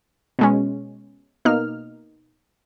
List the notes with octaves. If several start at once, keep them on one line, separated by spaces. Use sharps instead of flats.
B2 G#3 C#4
B2 A#3 D#4 F6